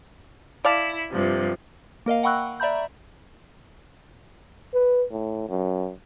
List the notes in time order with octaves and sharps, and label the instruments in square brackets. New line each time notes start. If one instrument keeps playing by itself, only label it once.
[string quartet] E4 [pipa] D5 F5 A5
[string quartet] G2 C3 F3
[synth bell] A#3 A#4 D#5 F5
F#5 G5 B5 C#6 E6 F#6
D5 E5 A#5 B5 G6
[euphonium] B4
A2
F#2